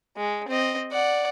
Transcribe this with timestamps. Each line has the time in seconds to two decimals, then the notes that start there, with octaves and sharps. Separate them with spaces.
0.17 G#3
0.48 C4 D#5
0.92 D5 F#5